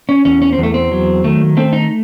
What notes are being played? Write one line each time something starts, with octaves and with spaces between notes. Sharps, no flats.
C#4
E2 C#4
C#4
C4
E2 A3
C4
F#3
D#3 A3
A3 C4
D#4